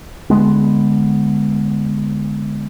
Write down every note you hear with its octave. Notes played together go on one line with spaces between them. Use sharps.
D3 F3 G#3 B3